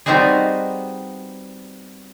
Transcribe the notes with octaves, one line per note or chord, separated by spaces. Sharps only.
G3 B3 C4 D#4 F#4 G#4